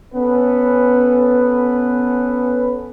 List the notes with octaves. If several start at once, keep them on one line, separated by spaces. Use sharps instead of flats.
B3 C#4 A4 B4